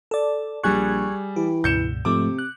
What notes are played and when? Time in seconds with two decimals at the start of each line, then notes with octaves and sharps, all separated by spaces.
0.11 A4 D5
0.63 A#1 G3 G#4 C#6 F#6 G#6
1.36 E3 G4
1.64 C#2 G2 B2 G6 C#7 E7
2.05 G#2 C3 F3 A3 D6
2.39 F#6